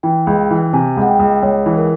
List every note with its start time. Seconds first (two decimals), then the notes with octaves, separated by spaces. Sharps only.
0.03 E3 G5
0.27 C#2
0.51 E3
0.73 C3 G#5
0.97 C#2 F#5
1.08 G5
1.19 C#2
1.42 C#2 C#5
1.66 E3
1.77 A#4